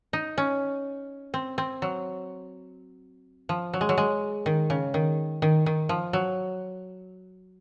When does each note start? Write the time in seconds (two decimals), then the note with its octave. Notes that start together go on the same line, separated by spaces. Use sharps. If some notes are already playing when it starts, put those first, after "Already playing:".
0.13 D#4
0.38 C#4
1.34 C4
1.58 C4
1.82 F#3
3.49 F3
3.73 F#3
3.81 G#3
3.89 F#3
3.98 G#3
4.46 D#3
4.70 C#3
4.94 D#3
5.42 D#3
5.66 D#3
5.89 F3
6.13 F#3